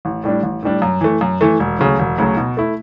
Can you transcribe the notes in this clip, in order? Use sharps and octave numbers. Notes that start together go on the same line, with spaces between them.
A1
A2 G3 D4
A1
A2 G3 D4
F#2
E3 A3
F#2
E3 A3
E1
D2 C#3 F#3
E1
D2 C#3 F#3
B2
A3 E4